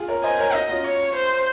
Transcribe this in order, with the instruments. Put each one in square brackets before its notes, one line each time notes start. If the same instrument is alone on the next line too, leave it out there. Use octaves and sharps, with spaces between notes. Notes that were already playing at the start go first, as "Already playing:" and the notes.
Already playing: [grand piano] F4 G#4
A#4 C#5
[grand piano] C5 D#5 [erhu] G#5
[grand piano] A#4 C#5
[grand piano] D#4 F#4 [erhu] D#5
[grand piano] C#4 F4
[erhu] C#5
C5